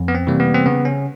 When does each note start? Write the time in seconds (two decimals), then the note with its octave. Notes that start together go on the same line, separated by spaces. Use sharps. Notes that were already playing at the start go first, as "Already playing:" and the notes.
Already playing: F2
0.08 B3
0.15 C4
0.27 C3 E3 G3 A#3
0.40 B3
0.54 C4
0.66 C#3 B3
0.85 C#4